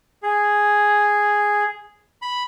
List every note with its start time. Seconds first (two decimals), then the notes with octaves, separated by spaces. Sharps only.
0.23 G#4
2.22 B5